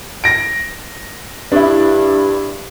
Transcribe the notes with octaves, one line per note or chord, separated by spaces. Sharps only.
A#6 D7
G2 D4 E4